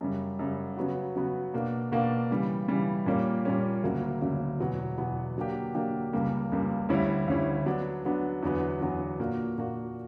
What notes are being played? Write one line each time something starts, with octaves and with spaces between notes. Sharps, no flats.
F#2 C#3 G3
F#2 C#3 G3
C#3 F#3 B3 F#4
C#3 F#3 B3 F#4
B2 A#3 D4
B2 A#3 D4
C#3 E3 G3
C#3 E3 G3
A#2 G3 A#3 C#4
A#2 G3 A#3 C#4
D2 C#3 F#3 A#3
D2 C#3 F#3 A#3
E2 B2 F#3 B3
E2 B2 F#3 B3
D3 F#3 A#3 D4 G4
D3 F#3 A#3 D4 G4
C#2 C#3 G3 A#3
C#2 C#3 G3 A#3
D2 D3 G3 C#4 E4
D2 D3 G3 C#4 E4
D3 F#3 B3 D4
D3 F#3 B3 D4
E2 D3 F#3 B3
E2 D3 F#3 B3
A#2 A#3 D4 F#4
A#2 A#3 D4 F#4